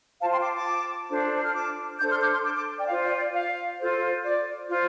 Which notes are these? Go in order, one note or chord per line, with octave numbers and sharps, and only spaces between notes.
F4 C5 F5 A5
G5 C6
A5 D6
A5 D6
D4 F4 A4 C5
F6
A5 D6
D4 A4 C5 D6 G6
C6 F6
D6 G6
C6 F6
A5 D6
A5 D6
D5 G5
F4 C5 F5
D5
D5
F5
F4 A4 C5
D5
F4 C5